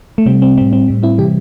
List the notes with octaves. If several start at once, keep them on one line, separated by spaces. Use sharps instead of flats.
A3
C3 G3 C4
C4
A2 G3 C4
C4
A2 G3
C4 E4
C3 E3 G3 G4